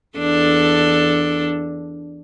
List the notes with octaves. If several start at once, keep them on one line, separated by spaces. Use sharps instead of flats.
E2 D4 A4